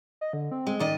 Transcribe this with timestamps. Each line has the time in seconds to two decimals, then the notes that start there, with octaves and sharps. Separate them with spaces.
0.21 D#5
0.33 D3
0.51 C4
0.67 G#3
0.80 G#2 D#3 D5 D#5